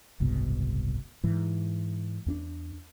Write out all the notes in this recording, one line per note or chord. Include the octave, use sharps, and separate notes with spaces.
F#1 C2 G#2 B2
G#2 E3
E2 C#4 D4